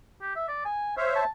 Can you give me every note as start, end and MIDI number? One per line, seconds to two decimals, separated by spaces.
0.21 0.34 67
0.36 0.48 76
0.48 0.63 74
0.65 0.96 80
0.97 1.24 72
0.97 1.24 73
0.97 1.24 76
0.97 1.11 77
1.16 1.28 81